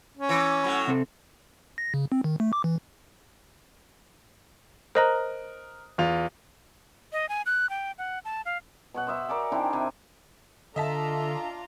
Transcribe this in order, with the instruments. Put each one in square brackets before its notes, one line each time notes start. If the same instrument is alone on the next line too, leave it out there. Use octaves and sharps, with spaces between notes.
[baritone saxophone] C#4
[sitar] E3
A2 F#3
[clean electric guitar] C3 C4 A4
[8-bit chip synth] A#6
C#3
C4
D#3
A3
D6
E3
[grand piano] A#4 D#6 F#6 [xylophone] C5 D#5 A#5
[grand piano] E2 F4 F7
[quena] D#5
G#5
F#6
G5
F#5
A5
F5
[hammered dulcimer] B2 C#5 F#5
C5 D#5 E5 B5
A#4 C#5 D5 G#5
D#3 C4 D4 E4
C3 G4 E5 G#5
[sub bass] D3 [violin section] D4 F4 A#5 [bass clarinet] A4 [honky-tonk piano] D#5 E5 A5